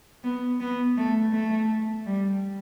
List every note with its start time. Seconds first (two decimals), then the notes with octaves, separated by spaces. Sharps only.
0.23 B3
0.60 B3
0.97 A3
1.32 A3
2.06 G3